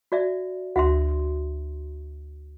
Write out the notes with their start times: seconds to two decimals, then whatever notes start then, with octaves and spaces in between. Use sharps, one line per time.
0.12 F#4 D5 E5
0.76 D2 F#4 E5 C6